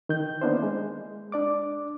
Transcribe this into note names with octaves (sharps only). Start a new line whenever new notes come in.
D#3 G6
A#3 B3 C#4 D4 E4 C5
G#3
D4 D5 D6